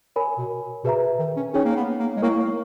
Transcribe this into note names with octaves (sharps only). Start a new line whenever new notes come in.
A#4 C#5 G#5 B5
B2
B2 G#4 B4 E5 A#5
D#3
C#4
C#4 D#4 G#4 C#5 G5
A#3
B3
A#3
G#3
A#3 E4 A#4 C#5 G5 C#6
A#3